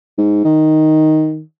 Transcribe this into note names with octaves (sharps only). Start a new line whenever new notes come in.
G#2
D#3